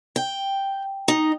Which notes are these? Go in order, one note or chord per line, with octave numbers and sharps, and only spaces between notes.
G5
D#4